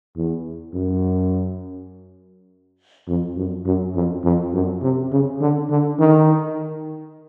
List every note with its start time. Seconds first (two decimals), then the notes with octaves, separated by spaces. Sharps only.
0.17 E2
0.74 F#2
3.08 F2
3.36 F#2
3.66 F#2
3.95 F2
4.24 F2
4.53 F#2
4.82 C3
5.12 C#3
5.41 D3
5.70 D3
6.00 D#3